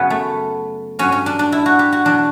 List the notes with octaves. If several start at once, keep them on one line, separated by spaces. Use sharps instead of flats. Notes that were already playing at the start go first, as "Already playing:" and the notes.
Already playing: F#2 C#3 F#3 B3 C#4
A3
G2 F#3 C#4
C#4
D4
D4
E4
F#4
G4
F#4
E2 B2 F#3 D4